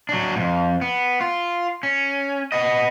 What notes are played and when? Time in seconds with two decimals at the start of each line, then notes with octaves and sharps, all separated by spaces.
0.09 F#3 D4
0.36 F2 G#2
0.81 B3
1.21 F4
1.83 C#4
2.52 B3 D#5